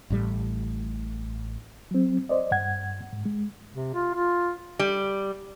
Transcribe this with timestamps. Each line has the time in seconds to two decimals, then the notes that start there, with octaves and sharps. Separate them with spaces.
0.10 A1 A2 G3
1.91 F#3 C4
2.29 C5 D5 D#5
2.52 G2 F#5 G#6
3.13 G#2
3.26 G#3
3.73 C3
3.94 F4
4.15 F4
4.79 G3